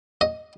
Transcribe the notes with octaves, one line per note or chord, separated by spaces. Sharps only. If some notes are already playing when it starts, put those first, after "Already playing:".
D#5